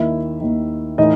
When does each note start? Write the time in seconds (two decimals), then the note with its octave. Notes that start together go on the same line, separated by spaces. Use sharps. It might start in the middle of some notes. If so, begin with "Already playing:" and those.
Already playing: D#2 D#3 E4 E5
0.41 D#2 D#3
0.98 A2 E3 D#4 D#5